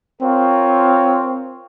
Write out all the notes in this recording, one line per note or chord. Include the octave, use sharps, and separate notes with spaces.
C4 F4 A#4 C#5